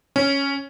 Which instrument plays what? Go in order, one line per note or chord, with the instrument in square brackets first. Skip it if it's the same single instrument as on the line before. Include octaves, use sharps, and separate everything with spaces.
[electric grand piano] C#4